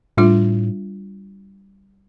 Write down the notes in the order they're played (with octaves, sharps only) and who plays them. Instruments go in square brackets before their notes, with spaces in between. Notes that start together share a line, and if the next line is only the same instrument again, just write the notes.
[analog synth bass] A2 [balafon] G3 D4 F4